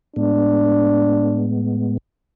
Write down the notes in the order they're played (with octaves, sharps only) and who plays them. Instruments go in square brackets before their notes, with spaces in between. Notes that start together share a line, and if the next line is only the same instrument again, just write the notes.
[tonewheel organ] A2 G#3 B3 [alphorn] D4